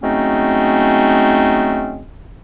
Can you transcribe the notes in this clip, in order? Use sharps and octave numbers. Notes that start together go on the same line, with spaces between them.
F#3 G#3 A3 C4 C#4 D#4